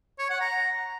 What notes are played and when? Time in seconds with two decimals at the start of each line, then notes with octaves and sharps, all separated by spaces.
0.19 C#5
0.30 F#5
0.41 A#5